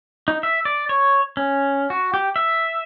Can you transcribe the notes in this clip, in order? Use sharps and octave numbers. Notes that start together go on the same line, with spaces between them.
D#4
E5
D5
C#5
C#4
F#4
G4
E5